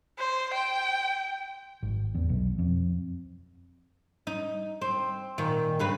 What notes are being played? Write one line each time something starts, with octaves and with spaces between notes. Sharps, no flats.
C5
G5
G#1
E2
B1
F2
D#4
C4
A#2 D#3
G2 C#3 B4